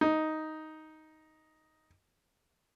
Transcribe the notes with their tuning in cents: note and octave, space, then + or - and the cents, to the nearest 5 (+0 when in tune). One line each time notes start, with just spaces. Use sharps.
D#4 +5